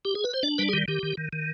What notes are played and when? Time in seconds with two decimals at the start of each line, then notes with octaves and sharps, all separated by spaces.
0.05 G4
0.15 G#4
0.24 B4
0.34 C5
0.43 D4 D5
0.58 G3 B4
0.69 G#4
0.73 D#3 G4
0.88 D#3 G4
1.03 D#3
1.17 D#3
1.33 D#3